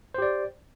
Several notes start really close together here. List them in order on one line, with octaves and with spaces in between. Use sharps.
C5 G4 D5